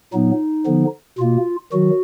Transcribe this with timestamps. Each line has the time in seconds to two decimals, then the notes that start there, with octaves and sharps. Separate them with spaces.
0.13 A#2 F#3 B3 D#4
0.66 D3 F3 B3
1.19 B2 A#3 F4
1.72 D#3 F#3 F#4